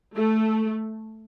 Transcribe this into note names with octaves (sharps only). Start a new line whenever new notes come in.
A3